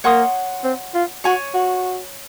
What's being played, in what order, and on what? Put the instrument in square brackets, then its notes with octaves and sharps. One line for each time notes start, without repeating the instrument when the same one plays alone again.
[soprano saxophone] A#3 [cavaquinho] C#5 F#5 C6 D#6
[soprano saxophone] C4
F4
[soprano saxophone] F#4 [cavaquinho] C#5 G#5 C#6
[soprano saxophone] F#4